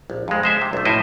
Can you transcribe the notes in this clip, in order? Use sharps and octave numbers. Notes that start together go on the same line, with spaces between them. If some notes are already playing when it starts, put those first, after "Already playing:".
A#1
F2 G#3
G#3 C5 E5
C3
B1 A3
A2 F3 E4 C5 D#5 E5